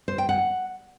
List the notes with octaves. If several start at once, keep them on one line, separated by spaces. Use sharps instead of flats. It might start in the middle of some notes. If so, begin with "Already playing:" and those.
C5
G5
F#5